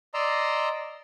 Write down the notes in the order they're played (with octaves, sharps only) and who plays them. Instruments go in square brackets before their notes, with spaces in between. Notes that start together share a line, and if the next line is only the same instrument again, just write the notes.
[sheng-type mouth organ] D5 D#5 A#5 C6 E6